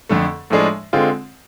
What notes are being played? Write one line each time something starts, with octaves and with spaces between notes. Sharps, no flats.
F2 D3 A3
A2 F3 G#3 D4 G#4
D3 G#3 C4 F4